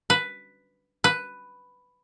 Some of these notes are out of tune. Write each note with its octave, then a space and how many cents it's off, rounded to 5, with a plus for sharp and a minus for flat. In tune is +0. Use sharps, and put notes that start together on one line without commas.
B4 +5
B4 +5